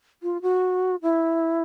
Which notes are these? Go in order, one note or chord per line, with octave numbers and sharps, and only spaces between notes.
F4
F#4
E4